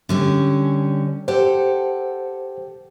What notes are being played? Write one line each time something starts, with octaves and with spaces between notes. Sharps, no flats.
D3 G3 C#4
G4 A4 C5 F#5